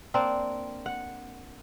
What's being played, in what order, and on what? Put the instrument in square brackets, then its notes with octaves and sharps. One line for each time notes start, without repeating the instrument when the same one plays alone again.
[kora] A#3 C4 D4
F#5